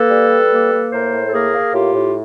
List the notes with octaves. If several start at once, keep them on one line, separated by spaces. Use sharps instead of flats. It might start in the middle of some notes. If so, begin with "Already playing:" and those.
Already playing: A#3 A4 B4
G3
G3
A#3
A#3
A2 A#4 C5
A2
A4
A#3 G#4 A#4
A#3
A2 F4 G4
A2